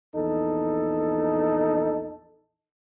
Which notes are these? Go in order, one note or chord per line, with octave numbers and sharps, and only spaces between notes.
A#1 E2 D#4 A4